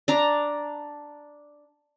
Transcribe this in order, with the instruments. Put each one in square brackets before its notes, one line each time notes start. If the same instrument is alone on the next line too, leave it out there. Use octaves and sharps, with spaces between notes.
[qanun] D4 A#5